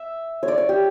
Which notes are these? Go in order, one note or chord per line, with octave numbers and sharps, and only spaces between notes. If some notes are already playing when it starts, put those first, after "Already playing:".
Already playing: E5
C#5
D5
C#5
G4